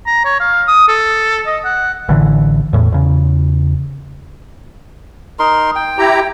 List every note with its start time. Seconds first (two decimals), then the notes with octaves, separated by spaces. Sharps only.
0.06 A#5
0.25 C#5
0.40 F5
0.68 D#6
0.88 A4
1.47 D#5
1.65 F#5
2.09 A1 D3 E3
2.73 E2 A2
2.92 E2 C#3
5.39 D#4 A#4 C6
5.75 G5
5.98 E4 G4 A#5